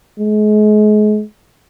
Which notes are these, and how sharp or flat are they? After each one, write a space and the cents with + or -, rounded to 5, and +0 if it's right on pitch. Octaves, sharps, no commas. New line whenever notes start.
G#3 +35